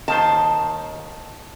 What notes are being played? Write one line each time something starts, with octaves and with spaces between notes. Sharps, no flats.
D#2 D#3 C5 A5